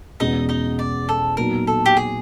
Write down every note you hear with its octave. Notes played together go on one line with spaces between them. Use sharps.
E2 B2 G#3 C#4 D#4 D#5
D#4 D#5
D5
A4
A#2 F#3 B3 D#4 F#4 A#4
A4
G4
G#4